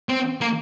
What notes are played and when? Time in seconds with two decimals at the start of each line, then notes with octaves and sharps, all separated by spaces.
0.09 C4
0.41 A#3